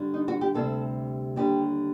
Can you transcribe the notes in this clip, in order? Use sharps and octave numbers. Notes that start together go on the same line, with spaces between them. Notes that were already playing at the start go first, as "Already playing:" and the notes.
Already playing: G2 D3 G3
D#4
F#4
G4
D2 C3 G3 A4
D#2 D3 G3 G4